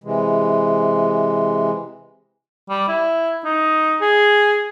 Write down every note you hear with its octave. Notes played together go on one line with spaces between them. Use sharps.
C3 E3 G#3
G3
E4
D#4
G#4